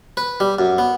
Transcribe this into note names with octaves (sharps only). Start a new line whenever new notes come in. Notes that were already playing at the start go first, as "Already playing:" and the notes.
B4
G3
F#2
B3